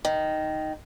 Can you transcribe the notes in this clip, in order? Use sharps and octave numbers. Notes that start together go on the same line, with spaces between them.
D#3